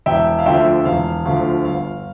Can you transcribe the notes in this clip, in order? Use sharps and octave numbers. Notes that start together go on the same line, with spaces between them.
E1 E5 G5
F5
D2 D3 F3 E5 G5
E1 F5
D2 D3 F3 F5
G1 F5